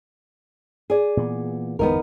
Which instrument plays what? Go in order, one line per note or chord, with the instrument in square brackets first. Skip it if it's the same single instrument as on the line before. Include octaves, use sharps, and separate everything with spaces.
[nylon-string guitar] G#4 D5
[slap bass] A#2 E3 B3
[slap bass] G1 E2 [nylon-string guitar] B3 D#4 A#4